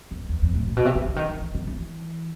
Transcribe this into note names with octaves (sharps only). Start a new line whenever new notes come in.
E2
E2
F2
A2
A#2
B2
C3
C#3
D3
D#3
E3
E3
D#3
E3